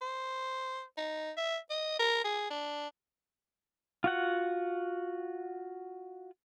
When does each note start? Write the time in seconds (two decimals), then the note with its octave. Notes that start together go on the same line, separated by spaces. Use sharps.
0.01 C5
0.97 D#4
1.37 E5
1.70 D#5
1.99 A#4
2.24 G#4
2.50 D4
4.04 F4 F#4 F#5